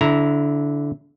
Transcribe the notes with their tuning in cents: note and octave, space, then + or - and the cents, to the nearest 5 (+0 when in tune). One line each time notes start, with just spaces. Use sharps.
D3 -20 E4 +0 A#5 +0